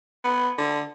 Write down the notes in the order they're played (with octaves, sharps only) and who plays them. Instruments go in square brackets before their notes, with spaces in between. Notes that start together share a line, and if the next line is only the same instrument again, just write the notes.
[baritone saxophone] B3
D3